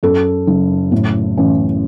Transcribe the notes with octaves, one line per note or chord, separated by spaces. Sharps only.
F#2 A4
F#1
A2
A1